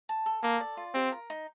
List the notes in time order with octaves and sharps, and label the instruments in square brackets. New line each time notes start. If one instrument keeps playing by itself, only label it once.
[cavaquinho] A5
A4
[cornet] A#3 [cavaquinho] A4
[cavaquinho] D5
F4
[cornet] C4 [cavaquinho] G4
[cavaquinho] A#4
D#4